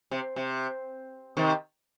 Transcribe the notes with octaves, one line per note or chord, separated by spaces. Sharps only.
C3
C3
C3 D#3